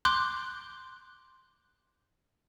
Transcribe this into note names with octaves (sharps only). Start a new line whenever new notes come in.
C6 D6 F#6 G6